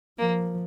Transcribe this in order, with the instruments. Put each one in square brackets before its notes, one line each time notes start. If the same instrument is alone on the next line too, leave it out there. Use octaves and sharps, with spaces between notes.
[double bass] F3 [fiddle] A#3